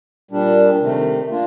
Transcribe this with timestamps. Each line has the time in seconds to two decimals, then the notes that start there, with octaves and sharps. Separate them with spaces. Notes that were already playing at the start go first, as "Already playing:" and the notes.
0.31 A#2 G3 D4
0.81 C3 D#3 A3
1.31 A#3 D4 F4